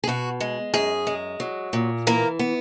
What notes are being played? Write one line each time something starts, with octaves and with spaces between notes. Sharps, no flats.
G#4
B2 F#4
G#3
F#2 G#4
G#3
F#3
A#2
E3 A#3 A#4
B3